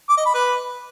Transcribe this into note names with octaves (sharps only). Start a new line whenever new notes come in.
D6
D#5
B5
B4